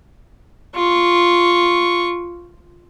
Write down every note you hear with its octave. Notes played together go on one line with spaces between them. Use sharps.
F4 C#6